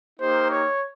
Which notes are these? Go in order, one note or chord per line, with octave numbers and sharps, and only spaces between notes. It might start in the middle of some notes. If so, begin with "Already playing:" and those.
A#3 D#4 G4 C5
C#5